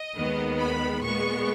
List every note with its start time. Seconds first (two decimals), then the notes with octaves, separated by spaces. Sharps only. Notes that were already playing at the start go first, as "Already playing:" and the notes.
Already playing: D#5
0.15 D#2 D#3 G#3 B3
0.59 B5
1.03 A#2 G#3 B3 C#6